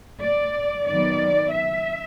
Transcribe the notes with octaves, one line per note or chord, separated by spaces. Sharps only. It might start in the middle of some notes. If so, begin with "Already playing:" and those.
D5
D#3 F#3 B3 D5
E5